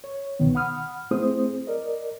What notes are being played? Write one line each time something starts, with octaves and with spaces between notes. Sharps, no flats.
C#5
C2 B2 D#3 B3
F#5 B5 D#6 F6
A3 C4 E4 G#4 C5 D#6
A#4 D5 D#5